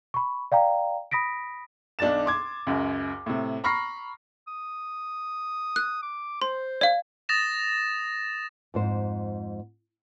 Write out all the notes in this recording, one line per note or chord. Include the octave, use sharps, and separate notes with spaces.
B5 C#6
D5 F5 G5 A#5
B5 D#6 A#6 B6 D7
B1 D4 D5 A6 E7
C6 D6 G#6
C#2 F#2
A2 C3
A#5 B5 C#6 F6 A#6 C7
D#6
F#6
D6
C5 C6
D5 F5
D#6 A6 A#6 E7
F2 G#2 C5